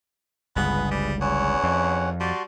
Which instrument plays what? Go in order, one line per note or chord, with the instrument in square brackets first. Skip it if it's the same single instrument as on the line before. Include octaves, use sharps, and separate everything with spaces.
[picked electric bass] G1 C#2 G2 [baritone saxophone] B3 [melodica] G#4 B4
[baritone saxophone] G3
[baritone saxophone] E2 [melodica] C#4 C#5 F#5
[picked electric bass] F2
[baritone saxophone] G3 [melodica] F#4 A5 C6